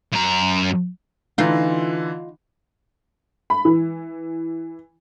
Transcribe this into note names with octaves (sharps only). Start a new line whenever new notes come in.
F#2 A#5
D3 E3 D#4 F4
B5
E3